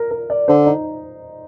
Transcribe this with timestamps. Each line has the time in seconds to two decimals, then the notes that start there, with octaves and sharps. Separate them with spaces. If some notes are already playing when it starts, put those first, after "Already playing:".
Already playing: A#4
0.11 A#4
0.30 D5
0.48 D3 C5
0.66 D#4